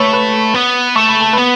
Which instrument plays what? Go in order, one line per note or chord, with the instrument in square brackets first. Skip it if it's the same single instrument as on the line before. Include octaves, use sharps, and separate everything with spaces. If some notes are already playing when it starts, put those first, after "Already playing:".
Already playing: [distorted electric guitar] A3 [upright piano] B4 C#5 B5 C#6
[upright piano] B4 B5
[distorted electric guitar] B3
[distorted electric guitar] A3 [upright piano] C#6
[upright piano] B5
A5
[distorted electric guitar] B3 [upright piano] B4 B5